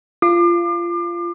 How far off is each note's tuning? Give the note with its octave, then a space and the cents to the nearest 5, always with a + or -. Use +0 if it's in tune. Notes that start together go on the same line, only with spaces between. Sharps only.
F4 -20 D6 +35